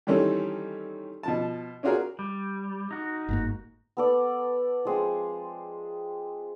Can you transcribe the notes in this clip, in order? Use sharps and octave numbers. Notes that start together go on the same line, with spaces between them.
D#3 E3 G3 C4 C#4 A4
B2 F3 A5
C#4 D4 F4 F#4 G#4 A#4
G3
D#4 F#4
G1 G#2 A#3
B3 A4 D5
F3 G#3 C4